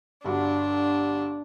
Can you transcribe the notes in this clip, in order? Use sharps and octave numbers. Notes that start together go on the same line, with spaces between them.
G1 G2 D4 F#4